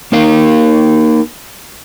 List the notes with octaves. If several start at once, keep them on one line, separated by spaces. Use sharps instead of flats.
A#3 D#4 A#4 F5